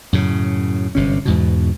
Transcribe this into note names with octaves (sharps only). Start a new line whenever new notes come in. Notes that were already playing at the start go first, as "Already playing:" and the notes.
F#2 A2 C#3
G1 C3 C#4
E2 G#2 B2